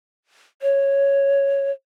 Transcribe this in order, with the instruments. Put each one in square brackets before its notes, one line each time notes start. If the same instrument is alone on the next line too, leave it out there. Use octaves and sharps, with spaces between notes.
[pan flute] C#5